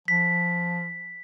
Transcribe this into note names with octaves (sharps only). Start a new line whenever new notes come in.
F3 B6